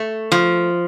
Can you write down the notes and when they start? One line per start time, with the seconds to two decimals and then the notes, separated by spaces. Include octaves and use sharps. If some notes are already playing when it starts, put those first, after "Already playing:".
Already playing: A3
0.32 F3